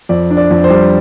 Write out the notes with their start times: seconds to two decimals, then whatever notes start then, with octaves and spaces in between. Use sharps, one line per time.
0.09 F2 D5
0.30 D4
0.37 D5
0.50 F2
0.64 C5
0.70 G3